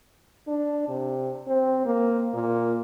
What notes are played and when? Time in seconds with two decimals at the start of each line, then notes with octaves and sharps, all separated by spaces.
0.47 D4
0.89 C3
1.47 C4
1.86 A#3
2.34 A#2